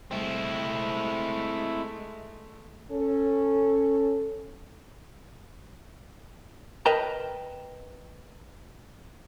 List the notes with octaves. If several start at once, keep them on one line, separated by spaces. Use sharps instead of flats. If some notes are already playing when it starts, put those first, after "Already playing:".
G#3 A3 C4 E4
C#4 A4
A#4 B4 D#5 G5 A5 A#5